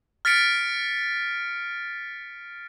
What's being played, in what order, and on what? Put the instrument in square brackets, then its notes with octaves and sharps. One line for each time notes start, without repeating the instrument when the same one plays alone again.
[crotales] F6 A6 B6 C#7 D7